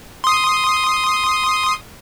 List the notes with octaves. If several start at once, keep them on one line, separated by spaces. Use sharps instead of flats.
C6 D#6